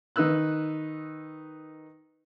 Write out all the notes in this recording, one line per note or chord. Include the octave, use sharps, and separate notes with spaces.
D#3 D#4 B4 E6 F#6